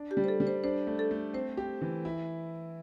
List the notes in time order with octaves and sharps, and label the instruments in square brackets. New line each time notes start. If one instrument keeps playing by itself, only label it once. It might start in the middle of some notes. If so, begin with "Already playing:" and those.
Already playing: [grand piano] D4
[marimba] G4
[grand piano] G3
[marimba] C5
A4
[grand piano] G3
[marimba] C5
[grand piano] D4 [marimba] C5
[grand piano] A3
[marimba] A4
[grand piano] A3
[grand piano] C4 [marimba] C5
[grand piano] G4
E3
E4